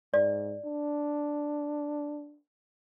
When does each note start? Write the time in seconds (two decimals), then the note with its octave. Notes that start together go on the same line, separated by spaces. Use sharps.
0.14 G#2 D5
0.65 D4